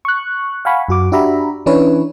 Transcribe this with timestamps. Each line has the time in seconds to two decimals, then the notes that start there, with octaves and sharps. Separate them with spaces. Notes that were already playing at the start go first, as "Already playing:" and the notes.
0.05 C#6 F#6
0.65 F5 F#5 G#5 B5 C#6
0.88 F#2 F#4 D6
1.12 D4 F#4 G4 E5 A#5 B5
1.66 E3 C#4 D4 E4 B4 C#5